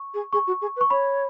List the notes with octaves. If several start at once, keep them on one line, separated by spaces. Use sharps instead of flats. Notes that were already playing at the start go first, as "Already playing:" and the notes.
Already playing: C#6
G#4
G#4 C#6
F#4
G#4
B4
C#6
C#5 B5